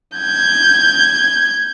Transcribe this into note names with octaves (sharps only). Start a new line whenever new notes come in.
G6 G#6